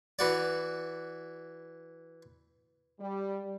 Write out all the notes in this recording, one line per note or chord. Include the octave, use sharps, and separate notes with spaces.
E3 F#4 D5
G3